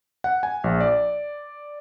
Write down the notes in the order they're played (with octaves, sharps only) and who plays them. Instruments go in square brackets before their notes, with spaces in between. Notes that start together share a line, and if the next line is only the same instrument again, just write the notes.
[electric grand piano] F#5
G#5
A#1
D5